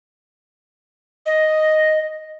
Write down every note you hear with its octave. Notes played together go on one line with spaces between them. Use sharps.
D#5